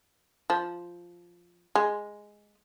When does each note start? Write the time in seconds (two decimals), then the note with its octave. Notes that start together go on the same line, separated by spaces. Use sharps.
0.50 F3
1.75 G#3